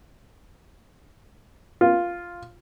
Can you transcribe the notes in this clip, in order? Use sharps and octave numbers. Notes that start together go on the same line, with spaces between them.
F4